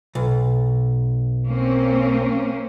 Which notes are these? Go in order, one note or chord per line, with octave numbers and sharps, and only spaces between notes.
B1
A#3 C4 C#4